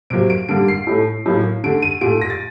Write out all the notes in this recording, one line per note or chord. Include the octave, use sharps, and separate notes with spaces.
C3 F#3 A#3 D7
D7
D3 G3 A#3 D7
C7
A2 A3
A2 F#3 A#3
D3 A3 D7
D#7
A#2 A3 D7
A#6
A6